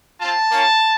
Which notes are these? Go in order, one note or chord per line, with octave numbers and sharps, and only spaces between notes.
C4 F4 A5
A#3 C#4 F4